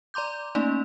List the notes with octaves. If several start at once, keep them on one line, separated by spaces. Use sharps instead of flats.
D5 A#5 C6 D6 G6
A3 A#3 C#4 D#4 D5